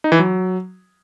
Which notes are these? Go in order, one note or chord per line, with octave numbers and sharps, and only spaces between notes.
D#4
E3
F#3